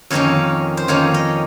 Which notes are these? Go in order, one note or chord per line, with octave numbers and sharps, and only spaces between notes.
F2 D#3 A#3 C#4 C#5
C5
F2 D#3 A#3 C#4 C#5
D#5